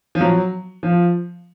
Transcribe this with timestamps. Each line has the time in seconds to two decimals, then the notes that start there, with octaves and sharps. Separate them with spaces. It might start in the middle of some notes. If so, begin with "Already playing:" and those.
0.15 F3
0.21 F#3
0.83 F3